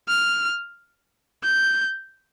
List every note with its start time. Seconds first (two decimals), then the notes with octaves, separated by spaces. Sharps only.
0.08 F6
1.44 G6